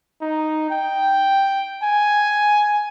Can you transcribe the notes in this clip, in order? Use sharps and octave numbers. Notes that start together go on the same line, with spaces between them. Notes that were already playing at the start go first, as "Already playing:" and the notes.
D#4
G5
G#5